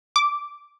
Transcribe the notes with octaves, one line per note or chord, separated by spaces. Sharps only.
D6